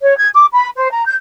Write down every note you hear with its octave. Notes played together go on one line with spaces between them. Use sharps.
C#5
G#6
D6
B5
C5
A#5
G6